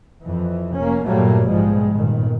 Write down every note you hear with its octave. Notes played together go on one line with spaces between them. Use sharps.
F2 E3
F1 A#3 C#4
G2 A#2 F#3 G3 A3 A#3
A#1 G#2 B2 F3 G3 G#3
G1 A#2 D#3